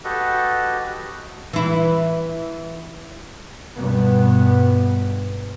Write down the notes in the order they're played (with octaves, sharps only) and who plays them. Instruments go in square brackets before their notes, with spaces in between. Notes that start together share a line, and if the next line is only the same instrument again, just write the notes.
[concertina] F#4 G4 A4 B4 D#5
[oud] E3 E4
[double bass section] G2 B2 B3